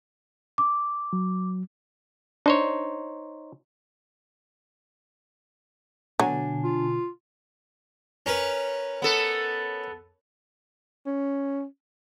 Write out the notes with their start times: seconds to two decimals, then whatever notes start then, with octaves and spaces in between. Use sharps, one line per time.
0.58 D6
1.13 F#3
2.46 D4 D#4 C5 C#5
6.20 B2 D3 F#3 D4 G#5
6.64 F4
8.26 C#4 A#4 B4
9.02 B3 A4
11.06 C#4